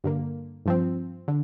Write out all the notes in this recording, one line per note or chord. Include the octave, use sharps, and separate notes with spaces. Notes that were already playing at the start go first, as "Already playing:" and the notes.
G2 D3 A#3
G2 F3 C4
D3